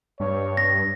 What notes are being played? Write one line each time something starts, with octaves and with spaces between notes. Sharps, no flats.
G2 C#5
A#6